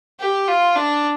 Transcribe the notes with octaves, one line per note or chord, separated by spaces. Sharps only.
G4
F4
D4